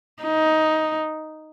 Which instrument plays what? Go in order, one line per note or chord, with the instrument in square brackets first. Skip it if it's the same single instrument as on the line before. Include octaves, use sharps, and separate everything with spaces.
[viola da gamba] D#4